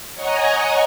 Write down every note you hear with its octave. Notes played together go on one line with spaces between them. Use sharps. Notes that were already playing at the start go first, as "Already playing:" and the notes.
C#5 D#5 F#5 G#5 A#5